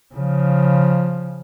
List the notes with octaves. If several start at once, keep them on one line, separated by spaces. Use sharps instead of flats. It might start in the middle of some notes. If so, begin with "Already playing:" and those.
C#3 F3